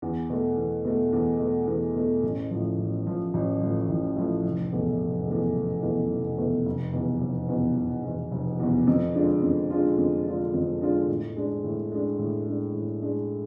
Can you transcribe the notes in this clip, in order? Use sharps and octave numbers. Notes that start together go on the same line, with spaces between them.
E2
B2 A3
E2
B2 A3
E2
B2 A3
E2
B2 A3
A1
A2 F3
A1
A2 F3
A1
A2 F3
A1
A2 F3
F1
E2 B2 A3
F1
E2 B2 A3
F1
E2 B2 A3
F1
E2 B2 A3
F1
E2 B2
F1
E2 B2
F1
E2 B2
F1
E2 B2
F2
D3 G#3 D4 F4
F2
D3 G#3 D4 F4
F2
D3 G#3 D4 F4
F2
D3 G#3 D4 F4
A2
G#3 D4
A2
G#3 D4
A2
G#3 D4
A2
G#3 D4